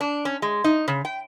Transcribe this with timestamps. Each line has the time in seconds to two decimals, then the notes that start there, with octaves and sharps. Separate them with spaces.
0.01 D4
0.25 C#4
0.42 G#3
0.64 D#4
0.88 C#3
1.05 G5